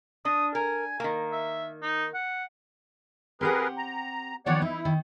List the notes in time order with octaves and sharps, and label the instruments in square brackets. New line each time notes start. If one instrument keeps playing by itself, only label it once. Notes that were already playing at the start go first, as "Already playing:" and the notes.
[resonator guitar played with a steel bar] D4 [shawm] D#6
[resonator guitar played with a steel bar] A#4 [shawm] G#5
[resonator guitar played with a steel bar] D#3 A#3
[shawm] E5
D#4
F#5
[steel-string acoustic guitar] C4 G4 F#5 [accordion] G#4 A#4 B4
[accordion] A#5
[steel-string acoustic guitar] D#3 F3 B3 [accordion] C#5 D5 F#5
[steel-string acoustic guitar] D#4 [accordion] E4
[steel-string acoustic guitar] D#3